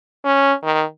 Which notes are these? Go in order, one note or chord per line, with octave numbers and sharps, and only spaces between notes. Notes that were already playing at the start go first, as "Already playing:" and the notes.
C#4
D#3